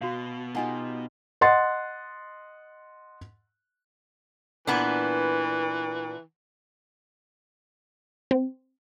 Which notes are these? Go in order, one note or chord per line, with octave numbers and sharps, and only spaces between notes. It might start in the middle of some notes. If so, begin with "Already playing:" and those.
B2 F#4 F5
D#4 F4 G4 A4 F#5 G#5
D#5 F#5 C6 A6
A#2 E3 B3 D4
C4